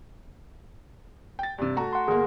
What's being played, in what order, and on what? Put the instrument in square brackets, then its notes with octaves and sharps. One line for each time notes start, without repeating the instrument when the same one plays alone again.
[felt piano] G5 A6
G2 C3
A3 F#4 A#5
[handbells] F#5 C6
[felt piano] G1 A#3 [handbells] G#4